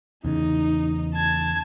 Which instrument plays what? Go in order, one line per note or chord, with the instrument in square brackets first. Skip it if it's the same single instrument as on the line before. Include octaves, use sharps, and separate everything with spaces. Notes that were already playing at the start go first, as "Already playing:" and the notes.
[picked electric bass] E2 C#3 [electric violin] D#4
[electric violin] A5 G#6